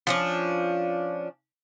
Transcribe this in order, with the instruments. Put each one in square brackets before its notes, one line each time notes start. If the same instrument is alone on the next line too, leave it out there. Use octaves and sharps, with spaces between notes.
[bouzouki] F3 C#4 D4